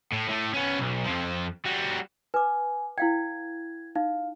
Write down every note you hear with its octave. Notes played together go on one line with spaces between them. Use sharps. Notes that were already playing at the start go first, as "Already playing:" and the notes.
A2
A2 A3
B3 C#4
B1
F2 F3
G3 F#4
B4 G#5 D6
E4 F5 G5 G#6
D#4 F5